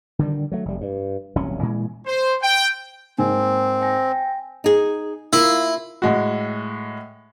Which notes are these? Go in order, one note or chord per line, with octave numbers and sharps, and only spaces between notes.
D3 D#3 G3
F#3 A3
F1 G3
G2
D#1 C2 F#3 C#4
A#2 E3 G#3
C5
G5
G#2 A#3 C4 G#5
G5 G#5 A#6
D#4 G#4
A#3 E4 F4
A2 G#3 F#4